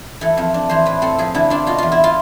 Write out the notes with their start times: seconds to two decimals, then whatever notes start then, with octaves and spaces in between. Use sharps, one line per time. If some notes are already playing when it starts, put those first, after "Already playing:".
0.21 E3 A4
0.37 F2
0.54 D4
0.70 E3 C5
0.86 A2 B4
1.02 C4 A4
1.18 F3 G#4
1.35 D3 E4
1.50 D4 F4
1.67 B2 F4
1.78 E2 F4
1.92 E4
2.04 F4